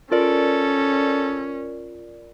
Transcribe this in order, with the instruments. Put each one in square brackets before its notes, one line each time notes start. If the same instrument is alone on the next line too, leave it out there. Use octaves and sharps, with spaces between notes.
[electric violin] C#4 [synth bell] F4 A#4 D5 [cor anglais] A4